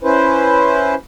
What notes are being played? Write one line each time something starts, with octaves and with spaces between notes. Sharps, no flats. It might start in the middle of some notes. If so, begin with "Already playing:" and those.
C#4 E4 B4 C5